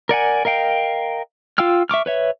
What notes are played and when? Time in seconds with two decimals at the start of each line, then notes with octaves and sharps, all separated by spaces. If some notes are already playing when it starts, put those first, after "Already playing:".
0.09 A#4 D5 F#5 G#5
0.45 A#4 D#5 F5 G5
1.58 F4 F5 G5 E6 F6
1.89 E5 C#6 D6 F6
2.06 B4 C#5 E5